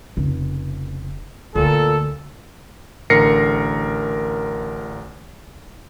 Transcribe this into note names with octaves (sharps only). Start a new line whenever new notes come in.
F1 C#3
D2 A#2 A4
A1 D3 A#4 A#6 C7 C#7